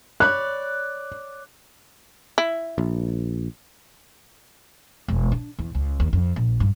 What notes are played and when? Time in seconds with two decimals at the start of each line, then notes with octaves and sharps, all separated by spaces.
0.20 C#5 D5 B5 F#6
2.38 E4
2.78 A#1
5.08 E1
5.32 D4
5.59 E2
5.75 C#2
6.00 D#2
6.13 F2
6.36 A#1
6.60 G2